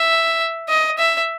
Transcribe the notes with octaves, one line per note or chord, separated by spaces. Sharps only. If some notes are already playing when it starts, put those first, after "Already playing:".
Already playing: E5
D#5
E5